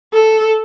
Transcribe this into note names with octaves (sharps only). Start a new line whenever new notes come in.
A4